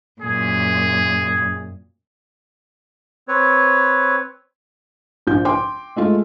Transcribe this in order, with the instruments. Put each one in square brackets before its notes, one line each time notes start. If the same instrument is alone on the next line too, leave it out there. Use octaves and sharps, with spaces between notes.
[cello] F#2 A#2 [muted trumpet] G#4
[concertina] C4 B4 C#5
[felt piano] A#1 F3 G6
G5 C6 D6
G#3 A3 F4